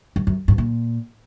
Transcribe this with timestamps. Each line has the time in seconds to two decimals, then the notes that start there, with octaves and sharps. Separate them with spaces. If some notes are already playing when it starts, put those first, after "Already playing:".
0.16 F#2
0.27 F#2
0.48 G2
0.58 A#2